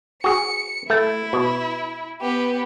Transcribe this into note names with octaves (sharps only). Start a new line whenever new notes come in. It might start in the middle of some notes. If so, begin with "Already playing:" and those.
F#4 G#4 C#7
A3 E4
B2
B3 G4